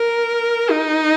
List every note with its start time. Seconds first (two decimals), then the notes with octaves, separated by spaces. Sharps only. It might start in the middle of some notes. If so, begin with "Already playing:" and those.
Already playing: A#4
0.71 D#4